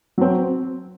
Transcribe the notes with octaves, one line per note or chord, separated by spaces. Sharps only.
F#3 C4